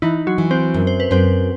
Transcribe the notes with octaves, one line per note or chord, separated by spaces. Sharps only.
E3 D#4 E4
F#3 F#4
E3
C4 C5
F#2
C5
B4
F#2 C4 C5